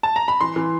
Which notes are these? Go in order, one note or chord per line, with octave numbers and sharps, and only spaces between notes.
A5
A#5
B5
E3 C6
E3